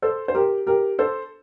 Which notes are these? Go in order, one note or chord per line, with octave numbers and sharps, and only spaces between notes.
A4 C5
C5
G4 A#4
G4 A#4
A4 C5